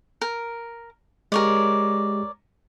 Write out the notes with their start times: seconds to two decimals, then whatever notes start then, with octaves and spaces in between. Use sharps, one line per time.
0.21 A#4
1.32 G#3 G4 A#4 C#5 D5